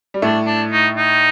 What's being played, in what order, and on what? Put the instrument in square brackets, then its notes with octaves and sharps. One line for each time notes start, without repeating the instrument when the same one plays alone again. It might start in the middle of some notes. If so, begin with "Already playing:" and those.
[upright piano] G3
[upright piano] A2 A3 [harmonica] D4
[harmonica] D4
D#4
D#4